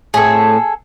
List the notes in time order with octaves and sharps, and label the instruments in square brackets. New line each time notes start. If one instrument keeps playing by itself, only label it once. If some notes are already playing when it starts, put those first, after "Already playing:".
[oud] A2 A3 C4 [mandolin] G#4 A4